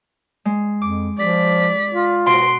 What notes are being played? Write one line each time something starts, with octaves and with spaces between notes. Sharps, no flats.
G#3
F2 D6
F3 D5 B6
F4
B2 F#4 C6 D7